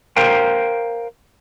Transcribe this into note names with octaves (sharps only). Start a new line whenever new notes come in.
A#4 C5 F5 G5